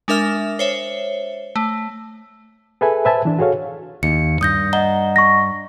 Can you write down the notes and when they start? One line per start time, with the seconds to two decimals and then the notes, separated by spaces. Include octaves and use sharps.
0.08 G#3 D4 A#4 E5 F6
0.59 C5 C#5 E5
1.56 A3
2.81 G#4 A4 B4 E5 G#5
3.05 B4 C5 E5 G#5 A5
3.25 E3 D4
3.39 F#4 G#4 A4 C#5 F5
4.03 D#2 C#7
4.41 G2 D#6 G6 A#6
4.73 D#5 F#5 A#5 G7
5.16 C#6 A#6